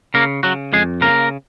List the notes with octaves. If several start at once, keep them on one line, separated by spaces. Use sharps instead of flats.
C#3 A#3 A#4
C#3 F#3 F#4
F2 G#3 G#4
C#3 A#3 A#4